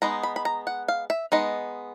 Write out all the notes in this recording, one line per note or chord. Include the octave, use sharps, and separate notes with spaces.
G#3 B3 D#4 A#5
B5
B5
A#5
F#5
F5
E5
G#3 B3 D#4 D#5